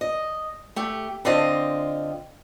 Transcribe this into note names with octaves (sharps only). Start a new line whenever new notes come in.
D#5
A3 G4
D3 C4 F4 D#5